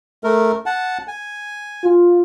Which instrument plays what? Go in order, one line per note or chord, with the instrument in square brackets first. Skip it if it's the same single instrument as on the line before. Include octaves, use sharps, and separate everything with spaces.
[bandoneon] A3 A#4
F#5 A5
G#5
[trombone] F4